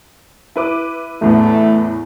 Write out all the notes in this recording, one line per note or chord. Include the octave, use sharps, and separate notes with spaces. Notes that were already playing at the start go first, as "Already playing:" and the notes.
E4 B4 D6
E2 A2 A3 B3